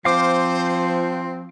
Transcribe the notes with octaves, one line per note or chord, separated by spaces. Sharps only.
F3 C4 C5 F5 D6